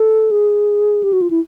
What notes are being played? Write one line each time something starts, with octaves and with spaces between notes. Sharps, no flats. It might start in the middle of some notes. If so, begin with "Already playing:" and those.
Already playing: A4
G#4
G4
F#4
F4
E4